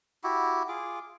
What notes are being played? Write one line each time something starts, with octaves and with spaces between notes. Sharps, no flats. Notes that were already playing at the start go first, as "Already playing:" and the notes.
E4 F#4 G4
F4 G#4 D6